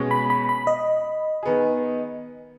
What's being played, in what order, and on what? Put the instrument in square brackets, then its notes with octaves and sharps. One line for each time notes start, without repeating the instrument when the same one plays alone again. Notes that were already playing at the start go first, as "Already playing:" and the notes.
Already playing: [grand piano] B2 G#3 C#4
[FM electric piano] B5
B5
B5
D#5
[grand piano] D#3 B3 G#4